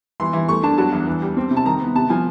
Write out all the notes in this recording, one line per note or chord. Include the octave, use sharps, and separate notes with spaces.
E3 C6
E3
A3 C#6
D4 A5
F#3 A5
E2
E3
G3
C4
C3
A5
D#3 A#5
B3
C3 A5
F3 G#5